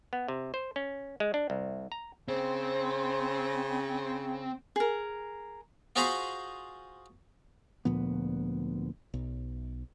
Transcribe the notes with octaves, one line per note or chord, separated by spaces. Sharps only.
B3
C3
C5
C#4
G#3
D4
C2
A#5
C#3 C4
G#4 A#4
F4 F#4 G#4 C5 A#5 B5
D2 A#2 F3 B3
B1